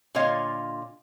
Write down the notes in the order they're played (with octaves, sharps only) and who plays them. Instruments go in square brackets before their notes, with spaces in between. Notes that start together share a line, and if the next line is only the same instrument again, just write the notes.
[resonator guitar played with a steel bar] A#2 D3 F4 C#5 D#5 F5